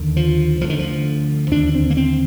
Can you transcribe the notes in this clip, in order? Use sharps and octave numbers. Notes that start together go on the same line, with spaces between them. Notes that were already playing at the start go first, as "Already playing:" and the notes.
Already playing: D#2 D3
F3
D2 D3 F3
D#3
F3
D#2 D3 D4
C4
A#3
C4